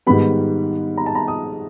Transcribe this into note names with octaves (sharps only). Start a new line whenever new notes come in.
G#2 D#3 G3 B3 B5
A#5
A5
A#5
D#6